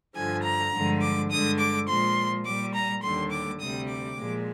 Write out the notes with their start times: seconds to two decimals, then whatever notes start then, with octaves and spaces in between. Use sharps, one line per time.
0.16 G2 D3 F3 G#5
0.44 A#5
0.73 G2 D3 F3 G#3
1.01 D6
1.30 G2 D3 G#3 D#6
1.59 D6
1.88 A#2 F3 G#3 C6
2.45 A#2 G3 D6
2.74 A#5
3.03 D#2 D3 G3 C6
3.31 D6
3.61 D2 C3 G3 D#6
3.89 D6
4.18 A#2 F3 G#3